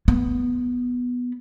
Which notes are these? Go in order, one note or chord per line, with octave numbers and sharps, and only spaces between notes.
B3